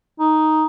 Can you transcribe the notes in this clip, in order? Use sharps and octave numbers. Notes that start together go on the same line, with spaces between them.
D#4